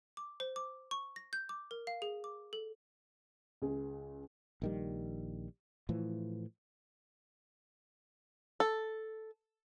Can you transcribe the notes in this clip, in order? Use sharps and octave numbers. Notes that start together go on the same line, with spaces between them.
D6
C5
D6
C#6
A#6
G6
D6
A#4
F5
G#4
D6
A4
C#2 G#4
A#1 D#3 G3
A2 E3 F3
A4